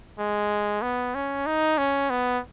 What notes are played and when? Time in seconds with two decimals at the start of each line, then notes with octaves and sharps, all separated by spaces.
0.18 G#3
0.82 B3
1.15 C#4
1.46 D#4
1.78 C#4
2.10 B3